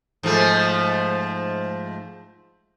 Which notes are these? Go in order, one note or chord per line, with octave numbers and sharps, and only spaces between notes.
G#2 F3 A3